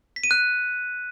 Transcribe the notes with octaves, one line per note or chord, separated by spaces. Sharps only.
B6
D#7
F#6